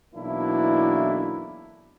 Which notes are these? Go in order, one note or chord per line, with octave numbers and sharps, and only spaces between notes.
B1 B2 E3 A#3 D4 E4